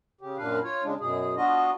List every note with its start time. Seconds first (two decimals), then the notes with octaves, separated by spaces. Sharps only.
0.21 C#3 G4
0.37 F#2 A#2 D4 B4 F5
0.63 F4 C#5
0.84 C#3 G#3 D4
1.00 F#2 B2 G#4
1.37 B3 D4 F4 F#4 D#5